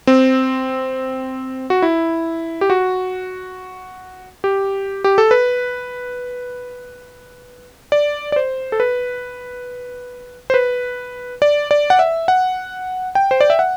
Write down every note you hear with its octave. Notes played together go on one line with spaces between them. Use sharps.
C4
F#4
E4
G4
F#4
G4
G4
A4
B4
D5
D5
C5
A4
B4
C5
B4
D5
D5
F#5
E5
F#5
G5
C5
D5
E5
F#5